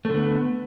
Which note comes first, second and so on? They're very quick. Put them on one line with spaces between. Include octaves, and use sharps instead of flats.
A3 D3 B3